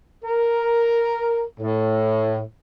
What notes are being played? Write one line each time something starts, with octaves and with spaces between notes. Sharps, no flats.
A#4
A2